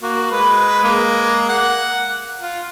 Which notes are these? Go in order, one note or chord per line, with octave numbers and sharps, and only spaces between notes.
A#3 F#4
G#3 B4
G#3 A#3
F#5
F4